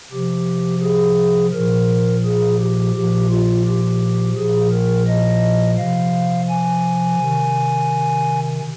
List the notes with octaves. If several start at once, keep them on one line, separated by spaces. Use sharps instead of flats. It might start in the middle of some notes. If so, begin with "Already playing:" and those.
C3 F3 G4
G#4
A#2 F3 A#4
G#4
G4
A#2 F3 G4
F4
G4
A#2 F3 G#4
A#4
D#5
C3 F3 F5
G#5
C3 D#3